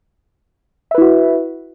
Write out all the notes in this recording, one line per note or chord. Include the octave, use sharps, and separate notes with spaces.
E4 F#4 B4 E5